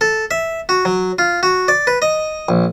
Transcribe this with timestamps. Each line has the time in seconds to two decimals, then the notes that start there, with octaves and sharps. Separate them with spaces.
0.01 A4
0.31 E5
0.69 F#4
0.85 F#3
1.19 F4
1.43 F#4
1.68 D5
1.87 B4
2.02 D#5
2.49 A#1